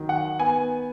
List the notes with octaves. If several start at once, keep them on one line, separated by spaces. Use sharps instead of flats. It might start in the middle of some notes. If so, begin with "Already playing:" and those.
Already playing: D#3 F#3
F#5
B3 G#5